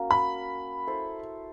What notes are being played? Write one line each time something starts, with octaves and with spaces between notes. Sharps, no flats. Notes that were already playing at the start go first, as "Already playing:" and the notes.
Already playing: A#3 C#4 F#4
B5
E4 A4 C5